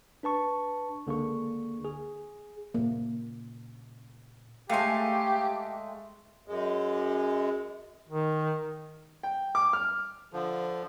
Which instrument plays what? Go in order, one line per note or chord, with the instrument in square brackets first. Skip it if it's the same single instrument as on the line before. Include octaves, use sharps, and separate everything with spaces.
[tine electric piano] D4 B4 A5 C#6
C#2 D3 A#3 G#4 C#6
G#4
[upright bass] A#2 C#3 [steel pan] A#3
[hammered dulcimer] G#3 A3 [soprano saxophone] G4 [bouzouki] F5 G#5
[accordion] F#2 G#3
[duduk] D#3
[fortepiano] G5
D6
F6
[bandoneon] D3 F3